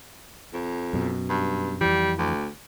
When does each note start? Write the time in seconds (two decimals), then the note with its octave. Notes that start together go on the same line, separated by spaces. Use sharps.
0.54 F2
0.93 F#2 B2
1.30 G2
1.81 F2 E3 G3
2.19 D2